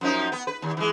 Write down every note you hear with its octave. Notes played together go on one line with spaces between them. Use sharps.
F#2 F3 D#4
B3
B4
D#2
E3 G#3